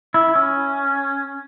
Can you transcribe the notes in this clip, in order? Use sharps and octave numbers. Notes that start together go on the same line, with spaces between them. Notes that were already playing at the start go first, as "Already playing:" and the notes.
E4
C#4